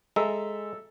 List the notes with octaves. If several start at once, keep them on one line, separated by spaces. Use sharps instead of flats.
G#3 A4 E5 A#5